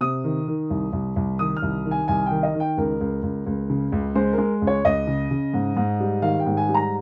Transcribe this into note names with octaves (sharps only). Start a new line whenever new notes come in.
C3 D#6
D#3
D#3
C2
C2
C2
D#3 D#6
F6
C2
D#3
G#5
C2 G#5
D#3 G5
D#5
D#3
G5
C#2 A#4
C#2
C#2
C#2
C#3
C#2
G#3 C5
A#4
G#3
C#2
C#5
C#2 D#5
C#3
C#3
G#2
G#2
G3
D#3 F5
G5
G#2
G#5
G3
A#5